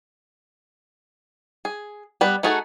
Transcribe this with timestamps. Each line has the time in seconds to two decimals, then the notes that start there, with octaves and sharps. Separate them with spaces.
1.65 G#4
2.21 G3 B3 B4
2.43 A3 D#4 F#4 G#4 A4